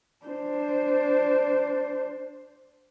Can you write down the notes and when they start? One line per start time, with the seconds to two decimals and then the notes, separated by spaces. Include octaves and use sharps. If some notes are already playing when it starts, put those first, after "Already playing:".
0.26 D4 C5